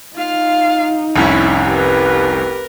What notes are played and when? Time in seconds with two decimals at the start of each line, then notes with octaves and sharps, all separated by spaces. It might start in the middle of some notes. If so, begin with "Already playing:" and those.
0.16 D#4 F4 F5
1.16 F1 C2 C#4 E4
1.70 G4 A#4 B4